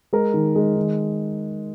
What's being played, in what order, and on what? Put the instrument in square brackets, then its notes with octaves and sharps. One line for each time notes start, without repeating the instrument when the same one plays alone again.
[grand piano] G#3 A#4
D#3
G#3
D#3